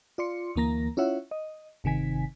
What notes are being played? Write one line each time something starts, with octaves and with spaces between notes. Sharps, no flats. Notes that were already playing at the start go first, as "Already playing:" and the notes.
F4 D5 C6 C#7
D2 E3 A#3 A#5 A#6
C#4 E4 F4 C#5 E5 F#5
D#5
G1 C3 D#3 G#5 B6